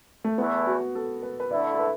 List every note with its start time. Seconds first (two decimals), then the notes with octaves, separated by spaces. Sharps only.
0.24 A3
0.38 E2 E3 A3 B3 E4
0.67 F#4
0.95 A4
1.23 B4
1.40 B4
1.51 D3 A3 E4 D5
1.74 A4
1.79 B4